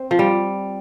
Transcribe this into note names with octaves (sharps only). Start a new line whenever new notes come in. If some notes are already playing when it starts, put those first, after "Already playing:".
Already playing: C4
F3
G3